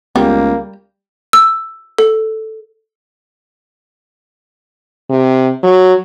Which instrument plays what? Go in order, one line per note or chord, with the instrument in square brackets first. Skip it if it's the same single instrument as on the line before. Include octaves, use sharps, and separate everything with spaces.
[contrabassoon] C#2 [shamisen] G3 [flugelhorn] A#3 [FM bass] B3
[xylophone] E6
A4
[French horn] C3
F#3